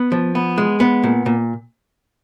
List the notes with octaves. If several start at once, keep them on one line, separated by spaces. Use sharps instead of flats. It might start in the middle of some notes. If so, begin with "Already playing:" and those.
Already playing: B3
F3
B3
G#3
B3
A#2
A#2